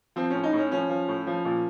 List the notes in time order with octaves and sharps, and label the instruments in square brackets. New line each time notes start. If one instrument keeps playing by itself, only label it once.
[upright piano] F3 C4
A2 C#4
D#4
A2 C#4
F3 C#4
F3
A2
F3
A#2